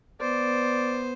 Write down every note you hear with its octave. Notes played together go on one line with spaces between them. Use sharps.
B3 C5 D5